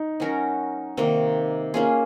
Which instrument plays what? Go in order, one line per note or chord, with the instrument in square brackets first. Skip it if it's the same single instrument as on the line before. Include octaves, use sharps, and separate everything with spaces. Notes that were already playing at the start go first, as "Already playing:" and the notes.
Already playing: [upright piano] D#4
[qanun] F#3 C#4 F#4 A#4
C3 D#3 A#3
A#3 C#4 F4 G#4